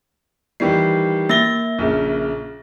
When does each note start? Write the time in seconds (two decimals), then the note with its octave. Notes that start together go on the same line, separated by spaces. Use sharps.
0.60 D#3 E3 G3 C7
1.29 A#3 A6 A#6 G7
1.78 A#1 C#3